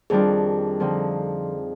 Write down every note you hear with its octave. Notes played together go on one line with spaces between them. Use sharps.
F2 D#3 G3 D4 F4 G#4
D3 F3 C4 D#4